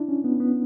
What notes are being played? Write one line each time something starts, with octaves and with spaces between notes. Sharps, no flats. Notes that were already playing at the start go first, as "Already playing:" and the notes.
Already playing: D4 E4
C#4
B3
B3